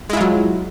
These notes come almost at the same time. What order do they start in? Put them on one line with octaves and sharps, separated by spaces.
G#3 E4 F4 F#3